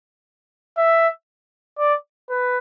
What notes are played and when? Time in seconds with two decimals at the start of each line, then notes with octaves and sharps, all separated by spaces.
0.77 E5
1.78 D5
2.30 B4